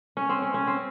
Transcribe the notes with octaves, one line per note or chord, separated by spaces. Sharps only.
C#4
C4
C#4
C#4
C4